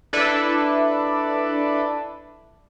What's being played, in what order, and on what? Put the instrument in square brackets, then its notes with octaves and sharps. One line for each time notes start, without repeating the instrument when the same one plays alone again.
[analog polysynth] D4 E4 A4 B4 D5